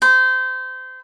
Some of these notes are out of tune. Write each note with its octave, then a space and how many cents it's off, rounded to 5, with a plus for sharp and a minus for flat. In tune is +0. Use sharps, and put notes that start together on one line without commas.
C5 -25